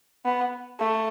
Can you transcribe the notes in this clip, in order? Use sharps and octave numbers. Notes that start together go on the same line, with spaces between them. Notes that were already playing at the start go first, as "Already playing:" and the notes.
B3
A3